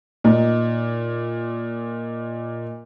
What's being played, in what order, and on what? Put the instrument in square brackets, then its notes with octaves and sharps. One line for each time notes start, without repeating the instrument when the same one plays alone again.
[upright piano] A#2 D#4